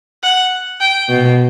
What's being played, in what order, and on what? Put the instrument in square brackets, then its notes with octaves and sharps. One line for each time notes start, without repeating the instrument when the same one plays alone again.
[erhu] F#5
G5
[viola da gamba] B2